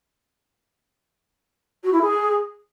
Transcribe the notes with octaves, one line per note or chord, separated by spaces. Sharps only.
F#4
E4
G#4